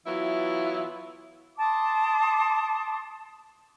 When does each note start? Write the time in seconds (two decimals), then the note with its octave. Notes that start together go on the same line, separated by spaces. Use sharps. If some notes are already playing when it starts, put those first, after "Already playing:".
0.06 E3 F#3 B3 E4 F4 E5
1.57 A5 C6 D6 D#6